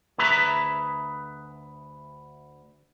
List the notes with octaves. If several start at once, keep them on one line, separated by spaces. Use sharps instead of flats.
D2 G#4 B4 E5 A#5